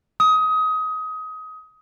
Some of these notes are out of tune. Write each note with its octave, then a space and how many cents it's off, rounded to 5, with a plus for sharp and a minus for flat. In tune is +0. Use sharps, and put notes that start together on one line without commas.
D#6 +25